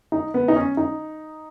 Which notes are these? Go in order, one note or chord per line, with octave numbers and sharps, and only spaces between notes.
D#4
B3
D#4
C#4
D#4